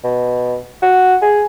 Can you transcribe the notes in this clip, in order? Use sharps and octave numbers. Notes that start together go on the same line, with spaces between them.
B2
F#4
G#4